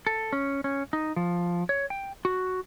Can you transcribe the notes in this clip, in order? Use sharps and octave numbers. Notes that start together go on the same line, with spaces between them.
A4
C#4
C#4
D#4
F3
C#5
G5
F#4